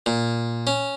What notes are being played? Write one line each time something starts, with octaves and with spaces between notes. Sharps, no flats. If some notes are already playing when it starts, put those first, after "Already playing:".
A#2
C#4